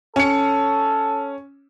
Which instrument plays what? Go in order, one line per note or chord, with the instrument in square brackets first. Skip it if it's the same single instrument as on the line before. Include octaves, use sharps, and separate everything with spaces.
[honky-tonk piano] C#4 C#7 [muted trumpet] A4